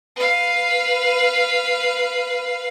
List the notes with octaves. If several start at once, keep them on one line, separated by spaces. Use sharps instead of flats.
B4 F5